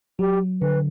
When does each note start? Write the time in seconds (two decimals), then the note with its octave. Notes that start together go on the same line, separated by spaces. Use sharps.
0.19 F#3 G4
0.61 D3 B4